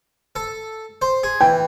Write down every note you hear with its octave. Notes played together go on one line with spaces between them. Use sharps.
A4
C5
G#4
E3 G5